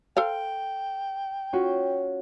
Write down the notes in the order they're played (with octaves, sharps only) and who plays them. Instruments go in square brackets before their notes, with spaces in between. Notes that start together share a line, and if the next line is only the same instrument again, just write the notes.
[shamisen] A4 C5 F5 [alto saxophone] G5
[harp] C#4 F4 F#4